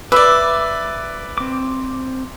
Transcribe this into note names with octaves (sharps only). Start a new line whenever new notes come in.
B4 D5 E5 D6
C4 D6